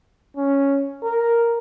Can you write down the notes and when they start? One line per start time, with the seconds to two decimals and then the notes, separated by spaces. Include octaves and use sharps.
0.37 C#4
1.03 A#4